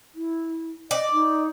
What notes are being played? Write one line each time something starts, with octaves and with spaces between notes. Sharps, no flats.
E4
D5 D#5
D#4